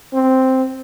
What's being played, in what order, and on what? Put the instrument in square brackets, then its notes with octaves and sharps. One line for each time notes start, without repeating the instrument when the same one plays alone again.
[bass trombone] C4